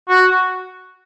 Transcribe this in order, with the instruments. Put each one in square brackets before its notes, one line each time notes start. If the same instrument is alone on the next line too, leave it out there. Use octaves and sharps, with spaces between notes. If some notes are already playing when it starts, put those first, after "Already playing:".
[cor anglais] F#4